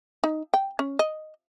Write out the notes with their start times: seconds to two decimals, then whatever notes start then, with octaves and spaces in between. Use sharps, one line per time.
0.24 D#4
0.54 G5
0.79 C#4
0.99 D#5